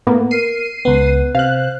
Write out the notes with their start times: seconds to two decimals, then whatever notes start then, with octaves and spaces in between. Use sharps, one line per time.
0.07 A2 A#3 B3
0.31 A#4 C7 D#7
0.85 C#2 B3 B4
1.35 C3 C5 F5 F#6